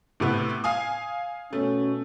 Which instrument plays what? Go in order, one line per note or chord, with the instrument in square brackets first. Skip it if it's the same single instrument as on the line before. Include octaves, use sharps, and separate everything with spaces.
[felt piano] A2 C3 B3
F5 G#5 D#6
[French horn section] B2 C#4 [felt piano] A3